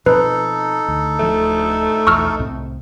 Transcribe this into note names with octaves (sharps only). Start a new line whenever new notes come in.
B2 F3 C4 D#4 A4 B4
D2
D1 F3 A3
B1 E2 C#6 E6 F6
C2 A2 C4